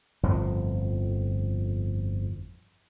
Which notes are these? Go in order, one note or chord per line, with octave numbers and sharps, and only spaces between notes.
G1 F2 A2 F3